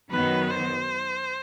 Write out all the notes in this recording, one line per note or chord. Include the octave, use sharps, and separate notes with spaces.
F#2 D#3 F#3 B3 B4
C5